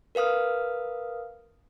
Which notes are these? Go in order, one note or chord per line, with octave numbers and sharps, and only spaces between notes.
A#4 B4 F5 D#6 F6